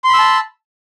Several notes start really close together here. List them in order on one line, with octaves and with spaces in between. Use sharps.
C6 B5 E6 A5